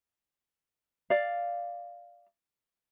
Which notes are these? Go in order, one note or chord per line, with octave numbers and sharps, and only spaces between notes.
D5 F5